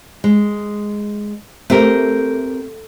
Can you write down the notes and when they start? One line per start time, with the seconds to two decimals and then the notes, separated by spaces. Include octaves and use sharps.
0.24 G#3
1.70 A3 C4 G4 A#4